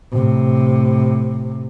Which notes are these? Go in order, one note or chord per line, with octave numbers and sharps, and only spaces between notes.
A2 C3